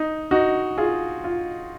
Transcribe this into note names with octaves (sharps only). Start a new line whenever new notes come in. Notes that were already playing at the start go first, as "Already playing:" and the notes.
Already playing: D#4
D#4 F#4
F4 G#4
F4